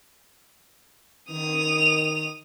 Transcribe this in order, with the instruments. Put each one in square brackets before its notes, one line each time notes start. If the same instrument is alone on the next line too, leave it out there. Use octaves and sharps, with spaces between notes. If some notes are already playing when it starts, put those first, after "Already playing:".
[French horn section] D#3 [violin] D#6 F7